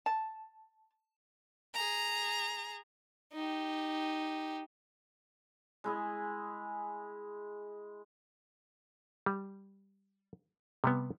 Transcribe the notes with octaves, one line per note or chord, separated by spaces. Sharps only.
A5
G#4 A#5
D#4 G4
G#3 E4 G#4
G3
C3 G3 B3